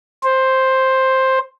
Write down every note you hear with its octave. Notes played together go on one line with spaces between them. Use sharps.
C5